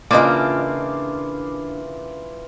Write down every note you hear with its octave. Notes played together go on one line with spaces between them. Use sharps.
C#3 E3 A#3 D4 F4 D#5 D6